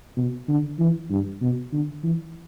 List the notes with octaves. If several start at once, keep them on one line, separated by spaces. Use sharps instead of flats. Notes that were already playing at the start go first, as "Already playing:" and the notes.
B2
D3
E3
G2
B2
D3
E3